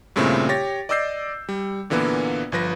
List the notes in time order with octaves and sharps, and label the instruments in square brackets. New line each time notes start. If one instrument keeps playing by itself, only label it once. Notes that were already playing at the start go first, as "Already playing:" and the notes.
[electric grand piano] G2 A#2 C#3 A3 C4 E4
G4 C#5 A6 A#6
D5 D#5 D6 E6 G6 C7
G3
A#2 D3 E3 A#3 B3
G1 F3 B4 A#6